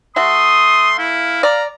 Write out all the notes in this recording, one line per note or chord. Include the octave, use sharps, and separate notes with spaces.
A3 F#4 C6 D#6
E4 F5
D5 A#5